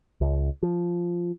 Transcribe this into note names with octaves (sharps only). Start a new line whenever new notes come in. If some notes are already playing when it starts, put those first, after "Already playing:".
C#2
F3